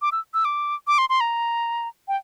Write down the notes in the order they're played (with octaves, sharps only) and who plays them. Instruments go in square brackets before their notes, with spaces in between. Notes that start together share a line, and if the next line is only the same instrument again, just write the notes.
[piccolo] D6
E6
E6
D6
D6
C6
C6
A#5
G5